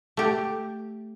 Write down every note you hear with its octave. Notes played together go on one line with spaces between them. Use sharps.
A3 G4